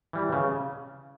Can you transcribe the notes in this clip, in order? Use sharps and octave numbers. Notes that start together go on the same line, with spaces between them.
E3 G3
C#3